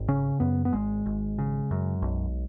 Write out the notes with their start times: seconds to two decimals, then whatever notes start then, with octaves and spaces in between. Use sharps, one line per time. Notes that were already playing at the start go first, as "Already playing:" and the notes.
Already playing: G#1
0.08 C#3 C#4
0.40 F#2 B3
0.65 B3
0.73 G#1 G#3
1.06 G#1
1.38 C#3
1.71 F#2
2.02 B1